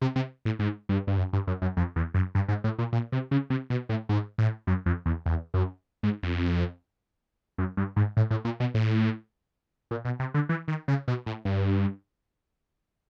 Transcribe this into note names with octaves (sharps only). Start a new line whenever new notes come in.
C3
C3
A2
G#2
G2
G2
F#2
G2
F#2
F#2
F2
E2
F#2
G2
G#2
A2
A#2
A#2
C3
C#3
C3
B2
A2
G#2
A2
F#2
F2
E2
E2
F#2
G#2
F2
F#2
G2
G#2
A2
A2
A#2
B2
A2
A#2
B2
C3
D3
E3
D#3
C#3
B2
A2
G2